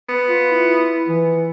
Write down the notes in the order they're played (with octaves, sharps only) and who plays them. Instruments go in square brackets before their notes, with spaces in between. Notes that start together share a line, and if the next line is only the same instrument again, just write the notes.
[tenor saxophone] B3
[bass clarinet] F4
E4
E3